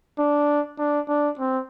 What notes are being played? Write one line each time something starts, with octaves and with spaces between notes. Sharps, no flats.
D4
D4
D4
C4